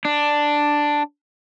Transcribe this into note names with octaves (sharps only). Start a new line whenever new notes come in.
D4